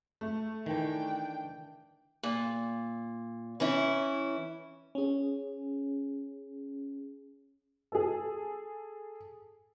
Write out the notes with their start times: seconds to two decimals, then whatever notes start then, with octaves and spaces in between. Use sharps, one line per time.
0.21 A3
0.66 D#3 E3 D4 G5
2.23 A#2
3.60 E3 C#4 E4
4.95 C#4 G#4
7.92 G#4 A4